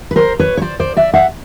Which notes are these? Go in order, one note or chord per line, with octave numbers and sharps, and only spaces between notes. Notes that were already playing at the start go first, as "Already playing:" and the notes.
B4
A#4 C5
B4 C#5
C#5
C5 D5
C5 D5
D5 E5
E5 F#5